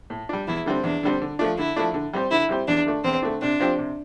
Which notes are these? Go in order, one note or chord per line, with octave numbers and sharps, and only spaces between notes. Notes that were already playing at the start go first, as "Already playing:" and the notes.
A2
G3 D4
E2 E4
D3 G3 C4
E2 D4
D3 G3 C4
D3
F3 A3 D4
D3 E4
F3 A3 D4
D3
G3 C4 G4 C5
D3 E4
G3 C4 G4 C5
E2 D4
D3 A3 D4
E2 C4
D3 A3 D4
C3 D4
F3 C4 G4 C5
C3